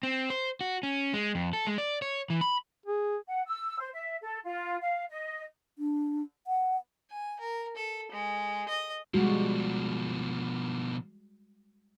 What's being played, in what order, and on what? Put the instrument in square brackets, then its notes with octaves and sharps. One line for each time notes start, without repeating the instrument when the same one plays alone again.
[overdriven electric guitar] C4
C5
F#4
C#4
G#3
F2
A4
G#3
D5
C#5
E3
B5
[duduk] G#4
[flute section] F#5
E6
C5
E5
A4
F4
F5
D#5
[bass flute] D4
F#5
[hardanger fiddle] G#5
A#4
A4
G#3
D#5
[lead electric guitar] B2 F3 [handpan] G3 G#3 F#4